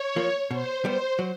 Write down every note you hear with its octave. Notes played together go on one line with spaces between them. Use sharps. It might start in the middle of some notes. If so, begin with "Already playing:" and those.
Already playing: C#5
F3 A#3
B2 C5
G3 B3 C5
F#3